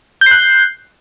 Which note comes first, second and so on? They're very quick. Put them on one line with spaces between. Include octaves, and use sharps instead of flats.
G6 C7 F#6